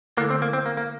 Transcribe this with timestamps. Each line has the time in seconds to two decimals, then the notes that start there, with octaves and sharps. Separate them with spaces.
0.18 D3 A3 A#3 E4 A4
0.30 C4
0.42 A#3
0.53 C4
0.66 A#3
0.77 A#3